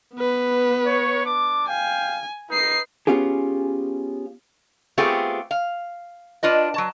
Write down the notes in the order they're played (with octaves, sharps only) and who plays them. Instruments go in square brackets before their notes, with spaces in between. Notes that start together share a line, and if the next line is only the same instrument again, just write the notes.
[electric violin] B3 B4
[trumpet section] C#5
D4 D6
[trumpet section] F5 G5 [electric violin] G#5
[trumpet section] D#4 [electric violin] B4 C7
[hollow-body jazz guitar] B3 C#4 F4 G4 G#4
[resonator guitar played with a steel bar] A3 B3 C4 F4 G4 G#4
F5
D4 F4 B4 D#5
F#3 A5